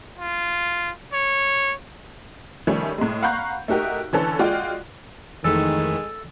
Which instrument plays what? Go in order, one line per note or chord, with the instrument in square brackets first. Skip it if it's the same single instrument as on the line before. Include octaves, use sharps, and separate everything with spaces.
[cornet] F4
C#5
[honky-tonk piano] D#3 F3 G3 A3 C#4
A2 G#3
F5 F#5 A#5 B5 C#6 G6
A3 D#4 F#4 G4 A#4
D3 E3 C#4 A4
G#3 F4 F#4 D5 G5
[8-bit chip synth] F2 E3 A3 [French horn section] D#3 [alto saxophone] G#3 [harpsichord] A4